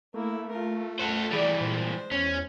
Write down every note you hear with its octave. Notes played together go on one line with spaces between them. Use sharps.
A3 A#3 E4
F4 A#4
A4 C5 F#5
E3 G3 G#4 D5
A#2 G#3 C5
E2 C#4